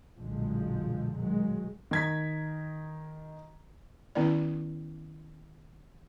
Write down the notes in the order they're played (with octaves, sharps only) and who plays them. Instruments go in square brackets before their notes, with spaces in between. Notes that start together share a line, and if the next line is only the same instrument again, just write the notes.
[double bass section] B1 F#2 A#2 D3 F3 G#3
D#3 F#3 G#3
[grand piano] D#3 G#6 B6
[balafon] D#3 B3 C#4 E4 D5